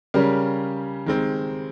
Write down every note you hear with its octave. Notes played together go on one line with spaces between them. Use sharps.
C#3 G3 C#4 G4 A#4
D#3 G#3 C4